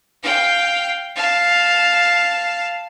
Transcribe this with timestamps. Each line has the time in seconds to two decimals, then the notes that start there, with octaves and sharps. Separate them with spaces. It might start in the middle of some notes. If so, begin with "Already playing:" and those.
0.23 F5 G5
1.16 F5 A5